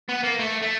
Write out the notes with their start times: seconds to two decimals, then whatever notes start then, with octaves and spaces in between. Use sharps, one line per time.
0.09 B3
0.23 A#3
0.39 A3
0.62 A3